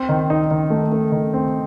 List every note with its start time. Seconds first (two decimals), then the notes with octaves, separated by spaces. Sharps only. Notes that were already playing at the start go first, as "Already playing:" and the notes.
Already playing: C4
0.09 D#3
0.30 D#4
0.51 D#3
0.70 A3
0.92 A3
1.12 D#3
1.34 C4